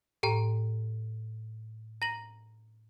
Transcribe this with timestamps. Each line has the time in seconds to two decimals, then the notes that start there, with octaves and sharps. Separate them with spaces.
0.23 A2 G4 G5 A#5
2.02 A#5 A#6 F#7